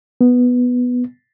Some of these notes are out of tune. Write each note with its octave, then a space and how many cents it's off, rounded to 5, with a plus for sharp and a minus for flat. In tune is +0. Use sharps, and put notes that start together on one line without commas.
B3 +0